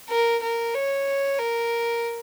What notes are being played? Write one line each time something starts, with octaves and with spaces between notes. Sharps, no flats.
A#4
A#4
C#5
A#4